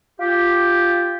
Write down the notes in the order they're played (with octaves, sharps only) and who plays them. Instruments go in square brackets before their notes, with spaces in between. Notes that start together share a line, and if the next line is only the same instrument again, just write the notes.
[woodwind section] F4 G4